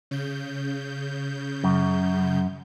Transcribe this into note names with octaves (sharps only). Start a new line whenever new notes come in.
C#3 G6
F#2